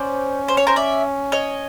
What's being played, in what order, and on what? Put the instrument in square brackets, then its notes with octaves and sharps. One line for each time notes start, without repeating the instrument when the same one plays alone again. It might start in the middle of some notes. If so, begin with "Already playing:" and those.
Already playing: [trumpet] C#4 [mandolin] C5 D5
[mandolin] C5
C#5
A#4 C5
D5 E5
C#5 D#5